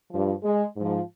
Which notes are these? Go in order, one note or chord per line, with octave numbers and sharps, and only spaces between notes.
G2 F3
G#3
G#2 F3